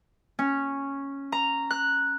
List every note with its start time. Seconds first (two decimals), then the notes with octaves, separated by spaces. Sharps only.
0.39 C#4
1.32 A#5
1.71 F#6